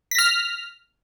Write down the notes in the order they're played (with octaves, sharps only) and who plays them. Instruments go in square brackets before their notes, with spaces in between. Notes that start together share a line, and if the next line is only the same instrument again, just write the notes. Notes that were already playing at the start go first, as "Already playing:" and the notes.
[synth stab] B6
A#6
F6